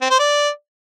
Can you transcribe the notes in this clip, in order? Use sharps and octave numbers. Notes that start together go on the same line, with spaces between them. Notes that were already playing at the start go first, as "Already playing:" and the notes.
C4
C5
D5